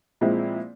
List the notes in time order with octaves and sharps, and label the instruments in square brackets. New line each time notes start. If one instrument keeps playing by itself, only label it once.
[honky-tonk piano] A#2 F3 G#3 C4 E4